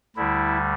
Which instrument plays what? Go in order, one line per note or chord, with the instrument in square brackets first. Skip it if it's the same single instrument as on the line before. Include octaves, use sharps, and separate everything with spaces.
[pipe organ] D2 D3 G3 E4